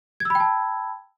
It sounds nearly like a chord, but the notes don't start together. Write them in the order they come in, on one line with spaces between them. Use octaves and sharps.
G#6 E6 B5 G5 A5